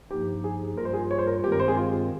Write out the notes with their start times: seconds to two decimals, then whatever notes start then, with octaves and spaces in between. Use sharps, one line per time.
0.11 G2 F3 A#3 D#4 G4
0.44 G#4
0.77 G2 G3 A#3 F4 A#4
0.85 C5
0.93 G#4
1.11 C#5
1.18 C5
1.27 A#4
1.43 G2 D#3 G#3 C4 G4
1.52 A#4
1.60 C5
1.68 G#4
1.76 F4